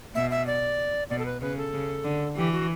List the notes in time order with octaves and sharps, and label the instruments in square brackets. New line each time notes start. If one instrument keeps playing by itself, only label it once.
[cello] B2 [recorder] E5
[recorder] E5
D5
[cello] B2 [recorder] D5
[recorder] A4
B4
[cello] C#3 [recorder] B4
[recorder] A4
[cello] C#3
D3
[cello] E3 [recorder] G4
[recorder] F#4